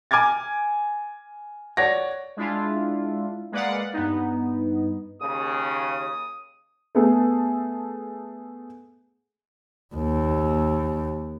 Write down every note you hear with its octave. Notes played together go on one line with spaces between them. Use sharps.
G#5 D6 F6 G#6 A6
C#5 D5 F#5 A#6
G#3 D4 E4 F4
G#3 A#3 B4 D5 F5 F#5
G2 B3 D#4
D#2 C#3 D#6
A3 B3 G#4 A4
D#2